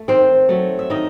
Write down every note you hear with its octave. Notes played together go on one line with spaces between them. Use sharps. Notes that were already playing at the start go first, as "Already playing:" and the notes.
Already playing: A3
D#3 C4 C5
F#3 A3
E5
D#3 D#4 D#5